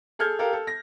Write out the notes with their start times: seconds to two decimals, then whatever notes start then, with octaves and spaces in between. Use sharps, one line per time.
0.19 G#4 A4 F6 G6 G#6
0.39 G4 A4 A#4 F5
0.53 A4
0.67 A#6